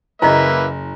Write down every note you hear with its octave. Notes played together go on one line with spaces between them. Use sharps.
F#1 A#3 E4 B4 D#5 E5 A#5